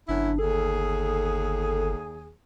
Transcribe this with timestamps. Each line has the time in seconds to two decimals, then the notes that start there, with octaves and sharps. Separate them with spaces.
0.09 G1 F#2 D4 E4
0.39 D#2 G#4 A4